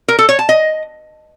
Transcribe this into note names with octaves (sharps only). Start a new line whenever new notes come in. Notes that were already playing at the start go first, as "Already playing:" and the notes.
A#4
A4
C#5
A5
D#5